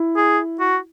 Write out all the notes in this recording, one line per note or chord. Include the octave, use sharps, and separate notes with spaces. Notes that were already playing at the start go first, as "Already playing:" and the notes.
Already playing: E4
G#4
F#4